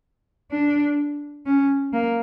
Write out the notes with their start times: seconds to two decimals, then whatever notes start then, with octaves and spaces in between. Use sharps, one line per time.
0.51 D4
1.46 C#4
1.92 A#3